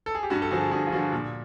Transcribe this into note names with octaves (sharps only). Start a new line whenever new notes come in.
A4
G#4
G4
G2 F#4
A4
D3 F3 F#4 G#4
G2 F#4 G#4
F4
D3 F3 F#4
A#2